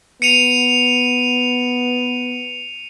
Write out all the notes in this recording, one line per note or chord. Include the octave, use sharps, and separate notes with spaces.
B3 C#7 D#7 F7